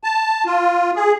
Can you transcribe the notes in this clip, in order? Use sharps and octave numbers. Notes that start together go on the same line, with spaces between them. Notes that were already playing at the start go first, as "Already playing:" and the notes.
A5
F4
G#4